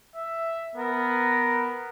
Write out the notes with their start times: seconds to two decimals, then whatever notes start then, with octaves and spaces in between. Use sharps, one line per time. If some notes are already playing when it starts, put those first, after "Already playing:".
0.16 E5
0.76 B3 A#4